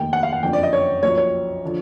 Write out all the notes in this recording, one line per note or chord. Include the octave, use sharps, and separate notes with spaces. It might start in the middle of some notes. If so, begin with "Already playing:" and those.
Already playing: F1 D#2 D#3 G5
F#5
F5
F#5
F#1 F2 D3 G5
D5
D#5
C#5
B1 A#2 F3 C#5
C#5
D3 F3